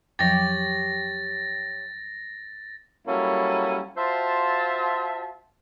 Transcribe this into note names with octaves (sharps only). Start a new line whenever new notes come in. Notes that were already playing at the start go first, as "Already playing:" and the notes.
F2 F3 F#3 G4 C#5 A6 A#6
F#3 G3 A#3 C#4 E4 A4
F4 F#4 C5 E5 A5